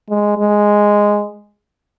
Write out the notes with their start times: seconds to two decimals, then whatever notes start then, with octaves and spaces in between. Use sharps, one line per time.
0.10 G#3
0.38 G#3